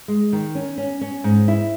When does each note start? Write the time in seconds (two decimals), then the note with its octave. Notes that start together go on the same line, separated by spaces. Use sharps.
0.08 G#3
0.32 D#3
0.55 C#4
0.78 C#4
1.01 C#4
1.24 G#2
1.48 E4